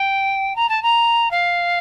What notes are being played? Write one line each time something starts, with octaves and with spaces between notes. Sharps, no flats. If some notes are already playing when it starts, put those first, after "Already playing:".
Already playing: G5
A#5
A5
A#5
F5